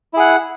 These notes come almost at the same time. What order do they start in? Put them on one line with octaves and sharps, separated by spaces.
E4 G#4 F#5